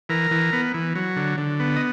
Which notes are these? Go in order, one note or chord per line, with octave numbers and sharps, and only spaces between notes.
E3 A#4
E3
B3
E3
F#3
D3
D3
B3
D#5